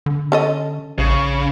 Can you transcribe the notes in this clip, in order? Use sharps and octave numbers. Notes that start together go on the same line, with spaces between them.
D3
C#4 A4 D#5
A#1 C#3